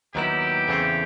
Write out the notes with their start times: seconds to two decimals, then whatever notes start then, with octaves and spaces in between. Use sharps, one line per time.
0.15 D#2 D#3 F#3 B3 E4 G4
0.68 E2 C#3 E3 A3 C4